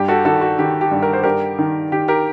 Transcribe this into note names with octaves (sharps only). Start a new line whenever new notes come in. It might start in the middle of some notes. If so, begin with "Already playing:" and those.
Already playing: G2 G4
F#4 A4
D#3 F#4 A4
F#4
D#3 G4
G4
G2
A#4
C5
G2 G4 A#4
D#3
D#3 G4
G4 A#4